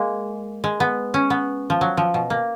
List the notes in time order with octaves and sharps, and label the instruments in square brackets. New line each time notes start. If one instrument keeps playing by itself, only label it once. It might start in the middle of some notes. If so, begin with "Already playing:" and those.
Already playing: [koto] G#3 A#3
G#3
B3
C#4
B3
F3
F#3
F3
B2
A#3